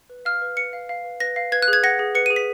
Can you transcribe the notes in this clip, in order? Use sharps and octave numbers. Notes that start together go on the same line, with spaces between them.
B4
F5 F6
B4
B4 C#7
F5
F5
B4
B4 A#6
F5
B4 G#6
F#6
G#4
G#6
F#5 A#6
G#4
B4 C#7
D#7
G#4
B6